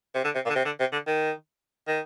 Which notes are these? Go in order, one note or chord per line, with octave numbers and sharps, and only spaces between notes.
C3
D3
C3
A#2
D3
C3
D3
C3
D3
D#3
D#3